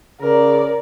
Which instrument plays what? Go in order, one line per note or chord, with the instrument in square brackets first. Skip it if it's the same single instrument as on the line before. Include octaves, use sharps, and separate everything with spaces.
[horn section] C#3 [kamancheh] A#4 D5